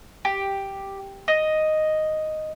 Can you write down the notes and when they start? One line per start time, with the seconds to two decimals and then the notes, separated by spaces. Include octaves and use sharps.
0.25 G4
1.28 D#5